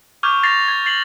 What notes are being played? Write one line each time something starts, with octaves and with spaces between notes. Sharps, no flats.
C#6 D6 F6 G6 G#6 F7
A6 A#6 C7 F7
G#6
A6 C7 F#7